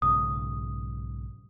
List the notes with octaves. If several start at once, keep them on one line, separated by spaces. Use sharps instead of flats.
B1 G#2 C#3 D#6